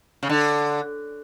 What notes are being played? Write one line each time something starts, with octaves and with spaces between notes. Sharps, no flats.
C#3
D3